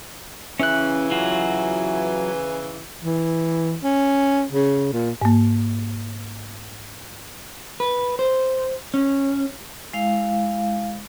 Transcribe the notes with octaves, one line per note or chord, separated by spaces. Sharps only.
C#3 E3 C#4 F#6
F#3 F4 F#4
E3
C#4
C#3
A#2
G#2 A#3
B4
C5
C#4
G#3 E4 F5